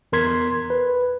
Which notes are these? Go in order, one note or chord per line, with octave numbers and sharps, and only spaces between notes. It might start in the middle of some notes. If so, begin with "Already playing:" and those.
E2 A#4 C6 G#6 B6
B4